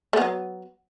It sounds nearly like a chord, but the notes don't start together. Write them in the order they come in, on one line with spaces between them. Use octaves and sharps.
A3 B3 F#3